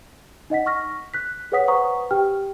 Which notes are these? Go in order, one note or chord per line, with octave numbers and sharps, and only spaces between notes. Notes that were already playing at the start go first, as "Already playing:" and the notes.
D#4 D#5 F#5 B6
C#6 F6 A#6
F#6 B6
G#4 B4 C#5 F#5 D#6 B6
B4 C5 F#5 A#5 C#6 D#6
G4 G5 F6